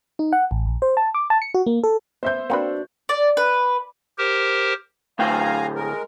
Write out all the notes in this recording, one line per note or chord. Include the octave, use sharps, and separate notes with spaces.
D#4
F#5
A1
A#1
C5
A5
D6
A5
C#7
F#4
A#3
A4
B3 C5 E5 G6
A#3 C4 D4 F#4 B4 F#5
D5
B4
G4 A#4 C5
D2 A2 F5 G5 G#5 A#5
G#3 A#4